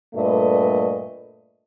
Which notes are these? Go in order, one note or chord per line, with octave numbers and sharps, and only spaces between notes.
G2 A#2 A3 A4 B4 D#5